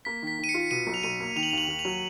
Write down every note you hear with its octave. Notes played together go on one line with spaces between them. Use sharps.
A#3 B6
D#3 B6
D#3 D#7
C#7
F4
B2 D#7
B1
F7
B1 D#7
A#3
D#3 F7
F#7
D#2 F7
F#7
D#2
F7
F#3